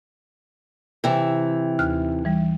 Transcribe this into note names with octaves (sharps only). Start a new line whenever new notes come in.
C3 E3
D#2 F6 F#6
E3 G3